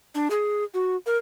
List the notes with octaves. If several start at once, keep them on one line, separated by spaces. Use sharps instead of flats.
D4
G#4
F#4
A#4